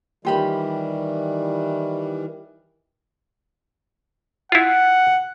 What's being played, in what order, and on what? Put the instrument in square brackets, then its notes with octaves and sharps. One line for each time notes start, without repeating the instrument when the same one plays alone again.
[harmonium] D#3 E3 G3 [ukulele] F4 G4 B5
[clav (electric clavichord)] E4 F4 [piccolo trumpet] F#5